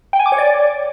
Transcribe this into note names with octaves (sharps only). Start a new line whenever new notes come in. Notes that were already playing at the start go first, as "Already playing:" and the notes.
G5
G#5
D6
C#5
D5